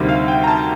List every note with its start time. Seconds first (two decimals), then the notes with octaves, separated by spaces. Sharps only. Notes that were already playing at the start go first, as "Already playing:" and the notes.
Already playing: D2 C3 D#3 G3
0.09 F5
0.28 G5
0.44 A#5
0.47 A5